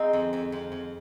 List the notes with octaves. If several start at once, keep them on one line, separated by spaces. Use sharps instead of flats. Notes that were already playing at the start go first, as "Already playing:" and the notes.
Already playing: G#3 C4 D#4
F2
F2
F2
F2